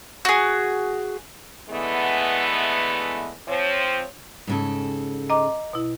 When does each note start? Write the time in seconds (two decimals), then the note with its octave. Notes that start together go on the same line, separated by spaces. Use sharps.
0.25 F#4 G#4
1.70 D3 E3 G#3 A3 B3
3.48 F3 C4 C#5
4.47 G#2 C#3 A4
5.30 D#5 A#5 D6
5.73 B2 E4